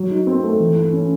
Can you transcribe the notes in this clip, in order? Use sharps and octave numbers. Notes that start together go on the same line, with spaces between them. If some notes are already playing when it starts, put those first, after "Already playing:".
Already playing: F#3
D#4
C4
A3
E3
E4
C#4